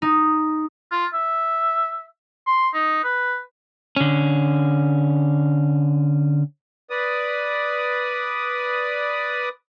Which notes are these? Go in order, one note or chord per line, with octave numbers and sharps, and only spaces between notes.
D#4
F4
E5
C6
D#4
B4
D3 C#4
B4 D5 D#6